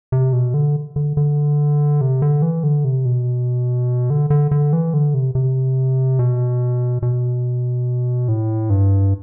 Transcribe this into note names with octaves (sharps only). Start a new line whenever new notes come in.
C3
B2
D3
D3
D3
C3
D3
E3
D3
C3
B2
D3
D3
D3
E3
D3
C3
C3
B2
B2
A2
G2